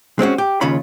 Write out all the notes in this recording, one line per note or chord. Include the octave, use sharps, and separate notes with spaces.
G#3 C4 C#4 F#4
G4
D#2 C#3 F4 C#5 B5